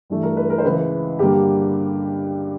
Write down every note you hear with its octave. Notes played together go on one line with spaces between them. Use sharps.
G2 E3 A3
A#4
B4
A#4
C5
C#2 C#3 E3 B4
G2 D3 G3 A#3 G4